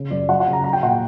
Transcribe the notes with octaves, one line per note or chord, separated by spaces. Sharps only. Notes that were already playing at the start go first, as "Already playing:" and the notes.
Already playing: C#3
F#2 D5
F#3 F#5
F#5
C#3
A#5
F#3 A#5
G5
A#2 F#5
G5